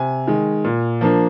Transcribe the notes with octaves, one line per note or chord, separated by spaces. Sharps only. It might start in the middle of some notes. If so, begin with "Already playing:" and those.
Already playing: C3 G#5
D#3 G#3
A#2
F3 A#3 D4